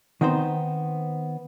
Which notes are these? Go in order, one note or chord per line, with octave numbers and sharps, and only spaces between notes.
D#3 B3 C4 D#4 C5